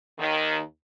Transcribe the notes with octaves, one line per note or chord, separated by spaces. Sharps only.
D#2 D#3